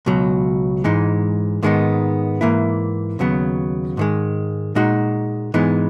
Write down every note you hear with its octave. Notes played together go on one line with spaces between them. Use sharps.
C#2 B2 F#3
G#2 E3 G#3 D#4
G#2 D#3 G#3 B3 D#4
G#2 E3 A#3 E4
D#2 C#3 F#3 B3
G#2 D#3 G#3
A#2 G#3 D#4 F#4
G#2 E3 G#3 B3 D#4